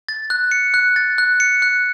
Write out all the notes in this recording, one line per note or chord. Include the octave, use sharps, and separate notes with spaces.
A6
F#6
C#7
F#6
A6
F#6
C#7
F#6